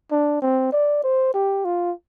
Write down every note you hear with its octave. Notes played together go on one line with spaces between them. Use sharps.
D4
C4
D5
C5
G4
F4